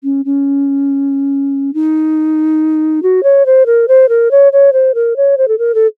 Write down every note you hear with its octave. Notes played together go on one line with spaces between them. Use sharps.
C#4
C#4
D#4
F#4
C#5
C5
A#4
C5
A#4
C#5
C#5
C5
A#4
C#5
C5
A4
A#4
A4